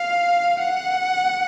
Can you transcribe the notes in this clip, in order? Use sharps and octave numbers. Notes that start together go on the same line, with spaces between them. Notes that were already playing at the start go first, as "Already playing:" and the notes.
Already playing: F5
F#5